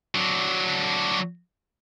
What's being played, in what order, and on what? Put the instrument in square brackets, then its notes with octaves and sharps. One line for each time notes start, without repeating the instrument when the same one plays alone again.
[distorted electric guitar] F#3 D4